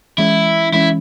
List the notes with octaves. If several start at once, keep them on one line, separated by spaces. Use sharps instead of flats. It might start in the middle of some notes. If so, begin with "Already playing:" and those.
E3 G#3 C#4 E4
E3 G#3 C#4 E4